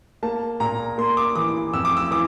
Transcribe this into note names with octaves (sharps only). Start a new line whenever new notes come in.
A#3 A5
A#2 A#5
A#3 C6
D6
E3 D6
F2 E6
D6
E6
E3 D6